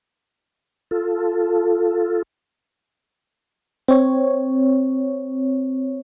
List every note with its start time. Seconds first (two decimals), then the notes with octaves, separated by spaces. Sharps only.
0.91 F4 A4
3.88 C4 C#5